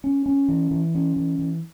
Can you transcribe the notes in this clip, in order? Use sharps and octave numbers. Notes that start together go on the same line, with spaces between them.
C#4
C#4
E3
E3
C#4
E3
E3